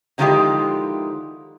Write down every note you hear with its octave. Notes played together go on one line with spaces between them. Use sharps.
D3 D#3 F3 G#3 E4 G4